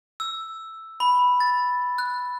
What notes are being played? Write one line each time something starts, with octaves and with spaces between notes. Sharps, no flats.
E6
B5
A6
F#6